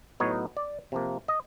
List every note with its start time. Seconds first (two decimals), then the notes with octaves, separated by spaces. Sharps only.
0.20 A2 F#3 B3 D#4 C#5
0.57 D5
0.92 C3 F3 A#3
1.28 D#5